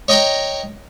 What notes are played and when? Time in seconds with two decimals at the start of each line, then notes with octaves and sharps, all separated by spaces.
0.08 C#5 D#5 G5 A#5